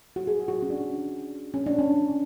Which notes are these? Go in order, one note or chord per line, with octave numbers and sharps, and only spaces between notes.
F#4
G#4
F#4
C#4
D4
C#4
D4
C#4